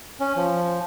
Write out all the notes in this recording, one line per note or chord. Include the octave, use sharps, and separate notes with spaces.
C#4
F3